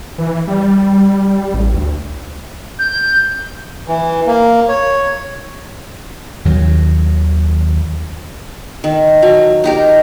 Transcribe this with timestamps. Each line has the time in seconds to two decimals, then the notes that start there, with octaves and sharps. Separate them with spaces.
0.18 E3
0.48 G3
1.54 A1
1.74 D2
2.79 G6
3.88 E3
4.26 A#3
4.68 C#5
6.45 D#2 D#3 F#3
8.84 D#3
9.22 F#3
9.64 D#4 G4 A#4